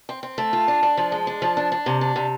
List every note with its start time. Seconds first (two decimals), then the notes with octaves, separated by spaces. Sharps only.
0.09 C4
0.23 C4
0.38 A3
0.53 F4
0.68 D4
0.83 D4
0.97 F3
1.12 G#3
1.27 D4
1.42 F3
1.57 D4
1.72 D4
1.86 C3
2.01 D4
2.16 C3